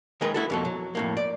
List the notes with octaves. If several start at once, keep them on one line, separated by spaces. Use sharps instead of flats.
D#3 G#3 G#4 A#4 B4
E4 F#4 A4
F2 B2 A4
F#3
F2 A2 A#3
D5